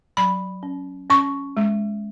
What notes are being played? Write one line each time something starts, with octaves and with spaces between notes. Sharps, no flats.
F#3 B5
C#4
C#4 C#6
G#3